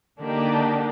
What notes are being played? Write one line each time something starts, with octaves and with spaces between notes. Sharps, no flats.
D3 A#3 D4 D#4 G4